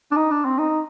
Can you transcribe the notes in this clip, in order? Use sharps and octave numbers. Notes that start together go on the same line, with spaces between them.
D4
D#4
D4
C4
D#4